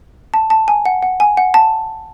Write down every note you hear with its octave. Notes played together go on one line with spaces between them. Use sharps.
A5
A5
G#5
F#5
F#5
G#5
F#5
A5